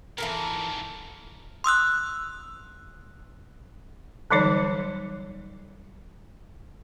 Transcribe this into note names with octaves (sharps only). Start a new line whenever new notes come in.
F2 G#2 E3 A4 A#4
C6 D#6 E6 F#6
D3 E3 F#3 G3 D#4 C#5